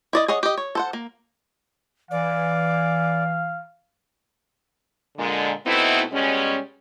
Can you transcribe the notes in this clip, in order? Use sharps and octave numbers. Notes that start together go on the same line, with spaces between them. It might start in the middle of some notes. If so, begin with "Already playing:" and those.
E4 D5 D#5
G#4 C#5 D#5 F#5
G4 D#5
C#5
A4 C5 F#5
A#3
E3 D5 F5
A#2 D3 G#3
B2 A3 B3 C4 D#4 E4
B2 G3 G#3 C#4